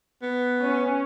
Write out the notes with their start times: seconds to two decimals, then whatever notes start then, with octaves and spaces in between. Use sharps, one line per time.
0.22 B3
0.61 C#4